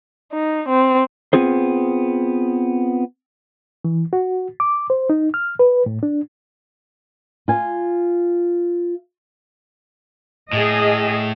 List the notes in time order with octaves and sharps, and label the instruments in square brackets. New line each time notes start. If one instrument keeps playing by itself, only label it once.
[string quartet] D#4
C4
[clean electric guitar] B3 C4 F4 G#4 C5
[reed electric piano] E3
F#4
D6
C5
D#4
F6
B4
A2
D4
[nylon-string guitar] F4 G#5
[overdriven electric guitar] A2 [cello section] G#4 D#5